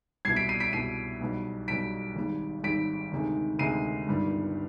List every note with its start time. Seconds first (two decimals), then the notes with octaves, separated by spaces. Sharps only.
0.25 C2 B2 G3 G#6 C7
0.36 B6 D7
0.49 C7 D#7
0.60 B6 D7
0.73 C2 B2 G3 C7 D#7
1.21 B1 B2 G3
1.68 B1 B2 G3 B6 D7
2.16 G#1 G#2 G3
2.64 G#1 G#2 G3 B6 D7
3.11 D2 C3 D#3 G#3
3.59 D2 C3 D#3 G#3 C7 D#7
4.07 G1 G2 D#3 G3